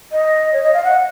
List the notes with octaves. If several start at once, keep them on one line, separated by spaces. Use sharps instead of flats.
D#5
C#5
D#5
F5
F#5